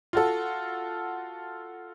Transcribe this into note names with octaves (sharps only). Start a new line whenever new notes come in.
F4 F#4 A4